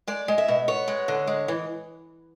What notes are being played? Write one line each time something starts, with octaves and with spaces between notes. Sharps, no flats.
G#3 D5
G#3
E5
B2
B3 C#5
G#3
D3
G#3
E3